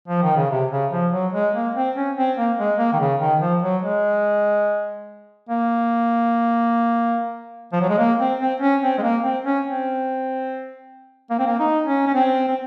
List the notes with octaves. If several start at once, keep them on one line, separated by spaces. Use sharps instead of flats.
F3
D#3
C#3
C3
C#3
F3
F#3
G#3
A#3
C4
C#4
C4
A#3
G#3
A#3
D#3
C#3
D#3
F3
F#3
G#3
A#3
F3
F#3
G#3
A#3
C4
C4
C#4
C4
G#3
A#3
C4
C#4
C4
A#3
C4
A#3
D#4
C#4
C#4
C4
C4